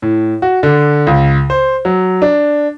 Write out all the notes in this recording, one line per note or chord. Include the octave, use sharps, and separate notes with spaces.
A2
F#4
D3
C#2
C5
F#3
D4